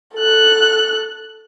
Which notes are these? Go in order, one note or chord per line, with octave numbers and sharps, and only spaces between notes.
A4 F#6